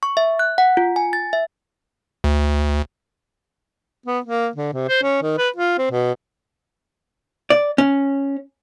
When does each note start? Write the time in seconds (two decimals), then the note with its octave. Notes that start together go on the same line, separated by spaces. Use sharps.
0.03 C#6
0.17 E5
0.39 F#6
0.58 F#5
0.77 F4
0.96 G#5
1.13 A6
1.33 E5
2.24 D2
4.06 B3
4.26 A#3
4.56 D3
4.73 C3
4.89 C5
5.03 C#4
5.22 D#3
5.38 B4
5.56 F4
5.78 C4
5.91 B2
7.50 D5
7.78 C#4